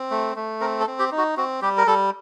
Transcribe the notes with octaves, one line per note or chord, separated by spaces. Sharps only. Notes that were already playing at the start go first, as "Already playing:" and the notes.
Already playing: C4
A3
A3
C4 A#4
A4
C4
G4
D#4
F#4
C4 F#4
G3 G4
A#4
G3 A4